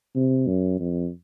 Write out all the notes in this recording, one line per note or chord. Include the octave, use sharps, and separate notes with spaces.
C3
F#2
F2